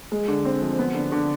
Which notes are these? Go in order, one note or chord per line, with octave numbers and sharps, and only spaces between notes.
G#3
D3
C4
F3
B3
D3
D3